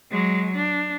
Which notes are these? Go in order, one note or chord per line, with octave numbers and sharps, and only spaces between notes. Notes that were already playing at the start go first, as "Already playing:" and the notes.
F#3 G#3
D4